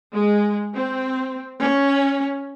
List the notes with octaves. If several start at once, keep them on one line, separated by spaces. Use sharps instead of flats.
G#3
C4
C#4